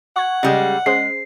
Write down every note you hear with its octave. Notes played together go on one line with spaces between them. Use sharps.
F#5 C#6 G#6
C#3 G3 G#3 D5 D#5
G#3 C#4 G#4 C5 C7